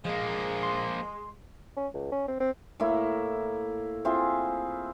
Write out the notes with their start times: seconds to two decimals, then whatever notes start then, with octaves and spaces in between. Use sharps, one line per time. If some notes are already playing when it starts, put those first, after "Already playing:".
0.05 F3 G#3 A#3
0.63 C6
1.77 C#4
1.94 C#2
2.12 C#4
2.28 C4
2.40 C4
2.80 A2 A#3 E4
4.05 C4 E4 F4 G#4